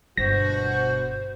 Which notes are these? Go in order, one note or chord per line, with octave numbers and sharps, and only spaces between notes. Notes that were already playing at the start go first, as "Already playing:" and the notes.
G1 B2 F#4 C5 A#6